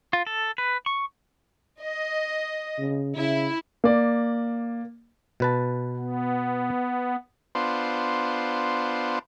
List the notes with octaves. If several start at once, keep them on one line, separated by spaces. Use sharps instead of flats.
F4
A4
B4
C#6
D#5
C#3
C#3 E4
A#3 D5
B2 B4 A5
B3
B3 D4 F4 C5